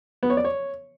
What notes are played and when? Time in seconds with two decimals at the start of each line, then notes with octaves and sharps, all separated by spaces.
0.23 B3
0.30 C#5
0.37 D5
0.44 C#5